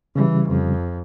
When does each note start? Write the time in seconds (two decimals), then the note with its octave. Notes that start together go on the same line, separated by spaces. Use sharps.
0.16 C#3 E3 G3
0.48 F2